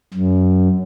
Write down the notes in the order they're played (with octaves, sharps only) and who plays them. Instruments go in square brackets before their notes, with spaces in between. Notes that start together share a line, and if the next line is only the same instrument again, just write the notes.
[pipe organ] F#2